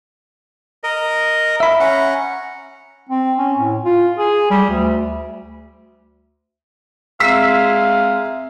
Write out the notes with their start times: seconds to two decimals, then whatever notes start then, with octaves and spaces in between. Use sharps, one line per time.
0.84 A#4 D#5
1.60 E5 B5
1.80 C#4 F#5 A#5
3.09 C4
3.38 C#4
3.59 A2
3.85 F4
4.18 G#4
4.50 G3
4.70 D2
7.20 G#3 C4 E5 F5 A#5 E6 B6 C7